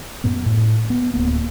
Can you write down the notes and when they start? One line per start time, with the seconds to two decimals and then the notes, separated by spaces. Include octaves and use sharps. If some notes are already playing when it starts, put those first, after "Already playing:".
0.24 F#2 A#2 B3
0.46 A2
0.90 B3
1.14 D1 A2 A#3 B3